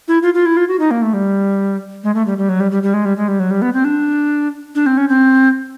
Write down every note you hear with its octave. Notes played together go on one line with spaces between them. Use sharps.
E4
F4
F4
E4
F4
F#4
D#4
A#3
A3
G3
G#3
A3
G3
G3
F#3
G3
G3
G3
G#3
G3
G#3
G3
F#3
G3
B3
C4
D4
D4
C4
C#4
C4